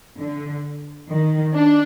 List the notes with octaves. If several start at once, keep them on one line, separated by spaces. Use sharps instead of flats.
D3
D#3
D4